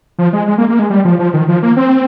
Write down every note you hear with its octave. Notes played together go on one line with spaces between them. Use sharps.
F3
G#3
G#3
A#3
A#3
G#3
G3
F3
F3
D#3
F3
A#3
C4